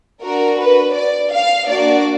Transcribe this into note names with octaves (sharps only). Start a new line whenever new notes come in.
D4 F#4 A#4
B4
D5
F5
A#3 D4 F#4 D5